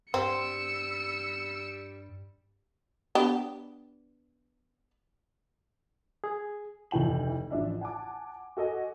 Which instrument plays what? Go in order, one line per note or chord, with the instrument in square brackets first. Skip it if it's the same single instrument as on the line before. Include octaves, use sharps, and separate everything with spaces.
[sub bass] G2 [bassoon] G3 [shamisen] C4 [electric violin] E6 C#7
[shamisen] B3 D4 G4
[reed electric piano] G#4
[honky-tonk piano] F1 D2 E3 G5 F#7
A1 F3 D4 E5
F#5 G#5 A5 D6
F#4 A4 D#5 G#5